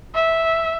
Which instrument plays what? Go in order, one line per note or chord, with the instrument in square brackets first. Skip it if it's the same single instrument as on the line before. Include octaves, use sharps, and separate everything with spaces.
[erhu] E5